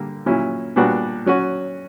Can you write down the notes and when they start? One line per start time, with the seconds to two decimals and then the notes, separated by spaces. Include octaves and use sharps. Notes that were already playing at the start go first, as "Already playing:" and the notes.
Already playing: D3 G3 A#3
0.26 A#2 F#3 C#4 E4
0.76 A#2 G3 B3 D4 F#4
1.26 F#3 C#4 F#4